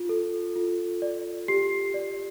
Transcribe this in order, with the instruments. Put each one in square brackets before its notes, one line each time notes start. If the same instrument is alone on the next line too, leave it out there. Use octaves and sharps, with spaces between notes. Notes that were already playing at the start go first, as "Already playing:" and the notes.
Already playing: [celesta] F4
A4
F4
D5
G4 C7
D5